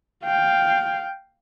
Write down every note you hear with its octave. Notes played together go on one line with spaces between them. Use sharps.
F5 G5